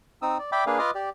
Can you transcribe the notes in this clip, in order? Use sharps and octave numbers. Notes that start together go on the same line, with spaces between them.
C4 D#4 D#6 E6
D5
D5 E5 G5 B5 D6
A#3 D4 G#4 B4 F5
F4 B4 D#5 D6 D#6 F6
G4 D5